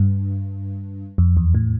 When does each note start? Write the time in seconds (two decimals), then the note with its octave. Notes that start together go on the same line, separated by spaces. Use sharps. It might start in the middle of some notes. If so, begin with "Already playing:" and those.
Already playing: G2
1.18 F2
1.37 E2
1.55 A2